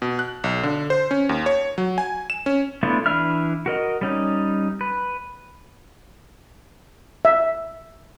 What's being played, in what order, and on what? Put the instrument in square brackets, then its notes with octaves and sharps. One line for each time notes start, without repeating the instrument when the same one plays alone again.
[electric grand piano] B2
F#6
B1
D3
C5
C#4
D#2
C#5
F#3
G#5
E7
C#4
[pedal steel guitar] A3 B3 D4 E4 F4
E3 D4 E5 B5 F6
F#4 A#4 D#5
G3 C#4 D#4
B4
[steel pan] E5